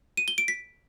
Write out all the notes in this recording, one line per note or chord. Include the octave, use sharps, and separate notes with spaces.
D#7
G7
D7
B6